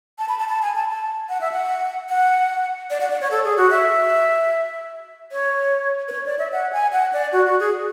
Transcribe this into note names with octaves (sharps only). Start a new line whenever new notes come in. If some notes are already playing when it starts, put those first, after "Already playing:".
A5
B5
A5
A5
G#5
A5
A5
F#5
E5
F#5
F#5
D5
F#5
D5
C#5
A4
G#4
F#4
E5
C#5
B4
C#5
D5
E5
F#5
G#5
F#5
D5
F#4
F#4
G#4